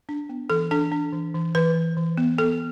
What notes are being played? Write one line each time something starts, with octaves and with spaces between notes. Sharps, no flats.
D4
B3
E3 A4
D4 A4
D4
E3
E3
E3 B4
E3
E3
B3
B3 A4